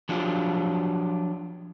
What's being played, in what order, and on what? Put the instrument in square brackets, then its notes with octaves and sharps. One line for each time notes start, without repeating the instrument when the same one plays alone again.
[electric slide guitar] F3 F#3 D4 F4 G4